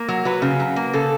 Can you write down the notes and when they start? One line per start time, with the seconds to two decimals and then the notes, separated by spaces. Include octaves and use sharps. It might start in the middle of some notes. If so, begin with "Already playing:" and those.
Already playing: A#3
0.08 F#3
0.25 F#3 B4
0.42 C#3
0.60 F#3
0.76 A#3
0.93 C#3 A4